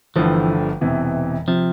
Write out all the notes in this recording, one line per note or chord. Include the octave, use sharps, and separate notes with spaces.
G1 G2 D3 E3 F3 A3
E1 E2 C3 E3
C3 F3